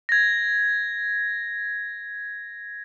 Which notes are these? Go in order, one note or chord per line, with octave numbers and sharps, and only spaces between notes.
G#6 A#6